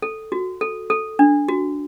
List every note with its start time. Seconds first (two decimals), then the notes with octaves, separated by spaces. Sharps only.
0.02 A4
0.32 F#4
0.61 A4
0.90 A4
1.19 D4
1.49 F#4